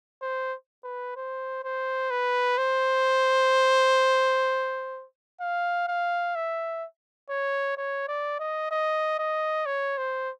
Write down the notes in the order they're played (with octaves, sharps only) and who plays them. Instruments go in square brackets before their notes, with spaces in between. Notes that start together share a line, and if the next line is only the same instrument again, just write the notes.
[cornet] C5
B4
C5
C5
B4
C5
F5
F5
E5
C#5
C#5
D5
D#5
D#5
D#5
C#5
C5